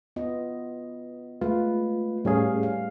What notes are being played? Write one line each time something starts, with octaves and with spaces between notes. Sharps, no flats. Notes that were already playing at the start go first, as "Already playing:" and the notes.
B3 F4 D#5
G#3 A3 F4 B4
A2 G3 C#4 G#4 F5
F5